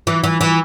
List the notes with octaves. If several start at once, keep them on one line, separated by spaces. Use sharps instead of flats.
E3
E3
E3